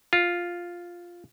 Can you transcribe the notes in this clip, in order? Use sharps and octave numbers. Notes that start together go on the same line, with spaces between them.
F4